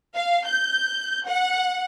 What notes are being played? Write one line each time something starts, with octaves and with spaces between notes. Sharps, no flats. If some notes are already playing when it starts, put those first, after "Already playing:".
F5
G6
F#5